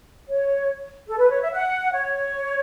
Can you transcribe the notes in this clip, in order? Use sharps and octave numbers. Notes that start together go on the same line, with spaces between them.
C#5
A4
B4
C#5
E5
F#5
C#5